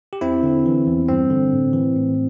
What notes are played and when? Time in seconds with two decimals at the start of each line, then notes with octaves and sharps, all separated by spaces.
0.13 G4
0.21 E2 C4 E4
0.43 D3
0.66 E3
0.87 E2
1.09 G2 C4
1.30 D3
1.53 A2
1.74 E3
1.96 A2